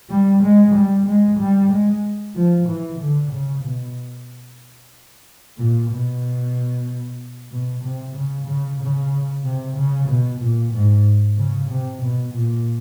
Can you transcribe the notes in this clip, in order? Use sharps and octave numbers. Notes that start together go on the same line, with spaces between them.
G3
G#3
G3
G#3
G3
G#3
F3
E3
D3
C#3
B2
A#2
B2
B2
C3
C#3
C#3
C#3
C3
C#3
B2
A#2
G#2
C#3
C3
B2
A#2